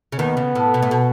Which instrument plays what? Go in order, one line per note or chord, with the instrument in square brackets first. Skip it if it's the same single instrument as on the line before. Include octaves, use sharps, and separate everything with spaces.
[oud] C#3
[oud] D#2 D#3 [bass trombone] B3
[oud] C#3
A2
B2
A2
B2